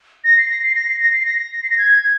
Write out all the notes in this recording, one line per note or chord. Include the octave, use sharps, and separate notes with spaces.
A#6
C7
A#6
C7
A#6
C7
A#6
C7
A#6
C7
A#6
G#6
G#6